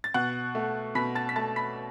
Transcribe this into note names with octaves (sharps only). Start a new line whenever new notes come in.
A6
B2 F#5 F#6
A3
B2 B5 B6
A5 A6
B6
A3 A5 A6
B5 B6